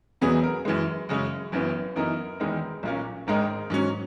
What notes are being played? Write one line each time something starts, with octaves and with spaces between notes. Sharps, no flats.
E1 E2 B2 F#3 B3 G#4
A#4
F#2 E3 G#3
F#2 C#3 G#3 C#4
F#1 F#2 E3 B3
F#2 E3 B3 D#4 A#4
E1 E2 D#3 G#3 D#4
B1 A#2 A#3 C#4
G#1 G#2 D#3 G#3 D#4 A#4
G#2 F#3 C#4